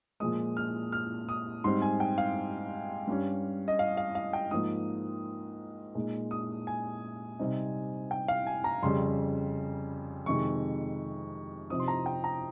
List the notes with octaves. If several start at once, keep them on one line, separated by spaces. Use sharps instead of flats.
A#2 F3 G#3 D#6
F6
F6
D#6
G#2 G3 C4 C6
G#5
G5
F5
G2 G3 C#4
D#5
F5
F5
F5
G5
G#2 F3 A#3 D#4 D#6
A#2 G#3 D#4
D#6
G#5
C3 G3 C4 D#4
G5
F5
G#5
A#5
F2 C#3 G3 C6
F2 C3 D#3 G#3 C#6
C3 F3 C4 D#4 D#6
C6
A#5
G5
A#5